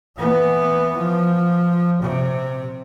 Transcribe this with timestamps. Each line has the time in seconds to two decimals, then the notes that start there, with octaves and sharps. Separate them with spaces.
0.17 E3 B3
0.97 F3
2.02 C3